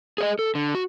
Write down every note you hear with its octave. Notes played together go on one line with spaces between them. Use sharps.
G#4 C#5 D#5
A4
D3
F#4